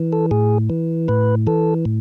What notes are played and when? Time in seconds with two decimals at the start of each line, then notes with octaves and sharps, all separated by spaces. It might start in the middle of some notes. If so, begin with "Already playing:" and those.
Already playing: E3
0.13 A4
0.31 A2 G#4
0.70 E3
1.08 A2 B4
1.47 E3 A4
1.85 A2